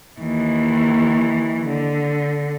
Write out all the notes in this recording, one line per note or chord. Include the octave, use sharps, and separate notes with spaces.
D#2 E3
D3